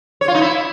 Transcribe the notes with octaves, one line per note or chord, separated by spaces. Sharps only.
C#5
F4
D#4
E4